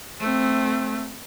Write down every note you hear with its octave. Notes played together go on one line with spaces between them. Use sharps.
A3 C4